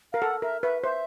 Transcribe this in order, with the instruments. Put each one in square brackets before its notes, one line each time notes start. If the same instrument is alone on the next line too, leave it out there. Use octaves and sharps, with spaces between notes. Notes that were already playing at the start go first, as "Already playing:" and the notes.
[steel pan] A#4 [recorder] F5
[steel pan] A4 [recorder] F#5
[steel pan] A#4 [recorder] E5
[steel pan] B4 [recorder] E5
[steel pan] C5 [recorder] E5